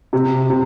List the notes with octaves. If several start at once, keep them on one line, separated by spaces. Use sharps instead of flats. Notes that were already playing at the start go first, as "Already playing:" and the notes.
C3
C3